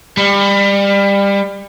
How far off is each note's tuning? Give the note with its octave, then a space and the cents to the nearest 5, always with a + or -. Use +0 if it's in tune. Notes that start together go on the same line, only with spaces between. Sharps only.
G3 +25